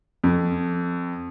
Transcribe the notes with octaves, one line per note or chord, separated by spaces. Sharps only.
F2